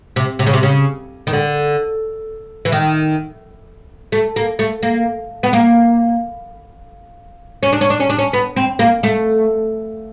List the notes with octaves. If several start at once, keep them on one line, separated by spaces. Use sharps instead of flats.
C3
C3
C#3
C3
C#3
D#3
D3
E3
D#3
A3
A#3
A3
A#3
B3
A#3
C#4
D4
C#4
D4
C#4
D4
C#4
B3
C4
A#3
A3